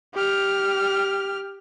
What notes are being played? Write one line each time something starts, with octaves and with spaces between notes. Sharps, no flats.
G4 F6